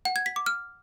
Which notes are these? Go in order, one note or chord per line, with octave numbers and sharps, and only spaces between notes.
F#5
G#6
B6
D6
F6